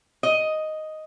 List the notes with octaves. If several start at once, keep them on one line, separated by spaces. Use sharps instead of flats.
D#5